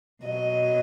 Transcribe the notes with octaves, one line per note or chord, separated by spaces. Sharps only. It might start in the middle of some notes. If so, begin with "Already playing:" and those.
B2 F#3 D#5